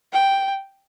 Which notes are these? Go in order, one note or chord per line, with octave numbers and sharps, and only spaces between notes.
G5